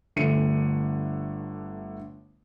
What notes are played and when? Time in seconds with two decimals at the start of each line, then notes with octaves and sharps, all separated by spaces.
0.16 G1 D3 A3 C#7 D#7